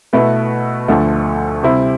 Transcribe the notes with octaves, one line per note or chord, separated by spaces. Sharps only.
B2 A3 E4 B4
D2 D3 F3 A3
C3 G3 C4 E4